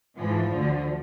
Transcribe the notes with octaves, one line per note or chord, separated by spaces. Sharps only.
G#2 E3 F3
D2 D3